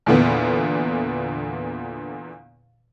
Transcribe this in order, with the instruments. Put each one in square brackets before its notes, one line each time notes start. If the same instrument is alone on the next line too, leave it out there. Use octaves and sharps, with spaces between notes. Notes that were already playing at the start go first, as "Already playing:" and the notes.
[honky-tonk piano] E2 A#2 D3 B3